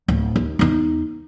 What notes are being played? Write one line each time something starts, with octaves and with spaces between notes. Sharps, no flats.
D1
D#2
E2 D#4